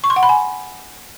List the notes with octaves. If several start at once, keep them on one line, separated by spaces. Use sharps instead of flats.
C#6
C6
F#5
B5
G#5